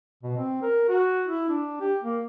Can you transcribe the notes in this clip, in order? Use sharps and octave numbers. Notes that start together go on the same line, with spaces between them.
B2
C4
A#4
F#4
E4
D4
G4
A#3